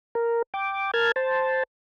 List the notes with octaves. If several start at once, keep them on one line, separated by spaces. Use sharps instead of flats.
A#4
G5 D6
A#4 A5 F6 G#6
C5 A5